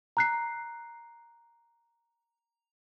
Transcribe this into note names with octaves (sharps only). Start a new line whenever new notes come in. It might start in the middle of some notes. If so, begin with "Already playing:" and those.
A#5 F#6 C7